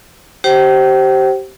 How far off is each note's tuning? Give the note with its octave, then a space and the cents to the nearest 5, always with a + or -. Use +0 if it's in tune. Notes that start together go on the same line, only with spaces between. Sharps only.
G4 -25 C5 +15 G5 -40